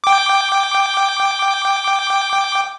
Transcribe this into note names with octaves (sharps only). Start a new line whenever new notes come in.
G5 D6